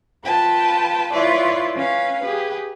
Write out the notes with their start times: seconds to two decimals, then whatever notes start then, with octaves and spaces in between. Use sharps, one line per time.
0.25 F4 B4 G5 A5 B5
1.13 E4 F4 B4 C#5 D5 C6
1.74 C#4 B4 F5
2.22 G4 G#4 B4